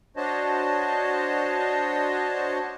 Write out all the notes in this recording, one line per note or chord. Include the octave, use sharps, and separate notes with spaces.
D4 F#4 C5 C#5 D#5 A5